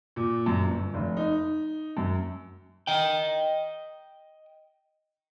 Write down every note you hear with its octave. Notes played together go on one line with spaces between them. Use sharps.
A#2
F#2
G1
F1
D#4
F#2
D#5 G5